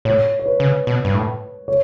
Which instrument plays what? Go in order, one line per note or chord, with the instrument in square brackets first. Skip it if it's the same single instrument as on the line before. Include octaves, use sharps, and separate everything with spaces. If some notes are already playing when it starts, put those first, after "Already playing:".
[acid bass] A2 [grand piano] C#5
[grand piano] C#5
B4
[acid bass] C#3
B2
G2
A2
[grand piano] C#5